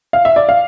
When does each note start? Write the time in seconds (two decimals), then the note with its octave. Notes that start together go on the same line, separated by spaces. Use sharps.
0.13 F5
0.25 E5
0.36 D5
0.49 F5